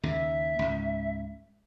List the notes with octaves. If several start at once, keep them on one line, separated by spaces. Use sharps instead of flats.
D#2 C#3 E5
C#2 G#2